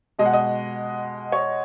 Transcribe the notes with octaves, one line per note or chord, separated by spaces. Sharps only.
B2 G#3 D#5
F#5
D#5
C#5